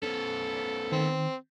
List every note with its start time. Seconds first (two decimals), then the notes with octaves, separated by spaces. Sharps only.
0.03 B3 C#4 A4
0.92 D#3 C4